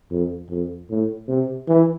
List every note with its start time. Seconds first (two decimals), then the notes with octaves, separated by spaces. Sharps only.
0.11 F2
0.50 F2
0.90 A2
1.28 C3
1.68 E3